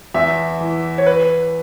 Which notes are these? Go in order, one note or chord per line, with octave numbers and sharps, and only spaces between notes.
E2 E5
E3
C#5
B4